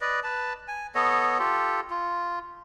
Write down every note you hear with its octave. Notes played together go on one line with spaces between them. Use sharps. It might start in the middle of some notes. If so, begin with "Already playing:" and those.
B4 D5 D#5
B4 A5
G#5
B3 A4 C#5 D#5
F4 G4 A4
F4